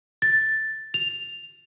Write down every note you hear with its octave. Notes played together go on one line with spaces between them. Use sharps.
A6
F7